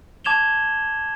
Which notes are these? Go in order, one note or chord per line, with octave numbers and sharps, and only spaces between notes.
A5 D6 G#6 E7 F7 G7